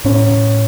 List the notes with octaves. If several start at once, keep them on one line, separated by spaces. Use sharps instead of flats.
A2 C#4
A2